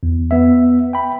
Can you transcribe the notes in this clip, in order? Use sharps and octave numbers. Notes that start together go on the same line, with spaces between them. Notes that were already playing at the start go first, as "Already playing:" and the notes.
E2
B3 E5
G5 B5